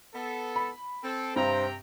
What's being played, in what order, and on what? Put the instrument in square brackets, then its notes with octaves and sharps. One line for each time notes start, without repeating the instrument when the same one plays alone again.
[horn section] B3 A4
[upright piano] B5
[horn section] C4 A4
[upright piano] G2 [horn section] C3 G5 A#5 [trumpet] C5